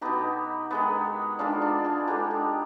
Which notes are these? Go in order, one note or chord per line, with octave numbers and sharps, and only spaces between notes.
B2 B3 D#4 G4
D#3 G#3 B3
D#3 G#3 B3 D4 F4
D4
F4 G#4
D3 G#3 B3 D#4 G4
D#4 G4